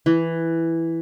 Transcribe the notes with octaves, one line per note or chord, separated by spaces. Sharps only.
E3